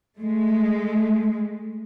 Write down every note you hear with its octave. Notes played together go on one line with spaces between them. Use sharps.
G#3 A3